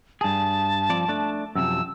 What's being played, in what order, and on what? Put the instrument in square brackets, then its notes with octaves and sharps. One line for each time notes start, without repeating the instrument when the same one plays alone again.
[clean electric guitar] G2 G#4 [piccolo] A5
[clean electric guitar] F3 C4 D5
A3 D4
[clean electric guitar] F#2 C3 F3 [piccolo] E6